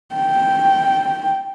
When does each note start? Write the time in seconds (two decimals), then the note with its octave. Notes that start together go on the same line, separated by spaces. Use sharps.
0.15 G5